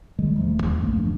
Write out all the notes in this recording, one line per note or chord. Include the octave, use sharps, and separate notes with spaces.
D#3 G3 G#3
D#1 F3 A3
D#2
A#1 F#2 A3 A#3
D2 G#2 F3 D4